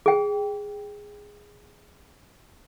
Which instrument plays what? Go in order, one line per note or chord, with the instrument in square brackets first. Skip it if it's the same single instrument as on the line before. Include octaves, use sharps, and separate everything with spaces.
[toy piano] G#4 G5